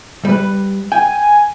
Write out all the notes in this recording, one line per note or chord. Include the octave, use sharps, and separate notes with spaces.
G3 B4
G5 G#5